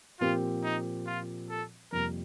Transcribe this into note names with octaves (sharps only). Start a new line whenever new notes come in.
A#2 F3 C4 F4 G4 A#4
D#4
F4
A4
F2 C3 G3 A#3 A#4